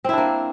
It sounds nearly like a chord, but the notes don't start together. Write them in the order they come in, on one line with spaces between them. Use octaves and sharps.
C4 E4 D4 A#3